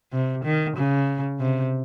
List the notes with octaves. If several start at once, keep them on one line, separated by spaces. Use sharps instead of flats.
C3
D#3
C#3
C3